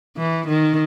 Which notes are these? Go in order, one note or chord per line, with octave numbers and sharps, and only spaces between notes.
E3
D#3